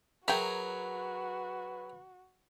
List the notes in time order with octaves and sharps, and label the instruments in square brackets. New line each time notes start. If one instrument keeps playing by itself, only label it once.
[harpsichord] F#3 G#4 A#4 [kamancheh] F#4 [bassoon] B4 [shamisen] E5 G5